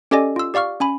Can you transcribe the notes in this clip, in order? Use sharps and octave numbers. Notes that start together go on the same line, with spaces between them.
C#4 G4 A4 D5 D#5 G#5
F4 E6
G4 D5 F5 C#6 F6
C#4 G#5 B5